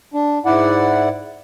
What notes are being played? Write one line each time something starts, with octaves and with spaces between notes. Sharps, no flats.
D4
G#2 E4 D5 F#5